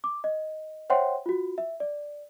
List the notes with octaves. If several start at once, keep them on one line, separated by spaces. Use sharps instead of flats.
D6
D#5
C5 C#5 E5 F#5 G5 C6
F4 F#4
E5
D5